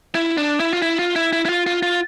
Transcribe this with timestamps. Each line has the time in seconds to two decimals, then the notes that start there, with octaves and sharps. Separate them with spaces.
0.15 E4
0.37 D4
0.60 E4
0.73 F4
0.82 E4
0.99 F4
1.16 E4
1.33 E4
1.45 E4
1.49 F4
1.67 F4
1.82 F4